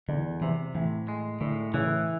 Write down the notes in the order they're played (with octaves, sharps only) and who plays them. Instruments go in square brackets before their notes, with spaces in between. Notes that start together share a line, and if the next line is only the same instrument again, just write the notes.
[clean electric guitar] E2 [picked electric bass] D3
[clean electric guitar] C3 [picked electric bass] E3
[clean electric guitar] A2 [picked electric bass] E3
[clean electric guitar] G#3
[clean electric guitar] A2 [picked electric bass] D3
[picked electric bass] C#3 [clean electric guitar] E3